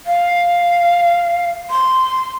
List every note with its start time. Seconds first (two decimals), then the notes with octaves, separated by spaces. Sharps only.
0.06 F5
1.70 C6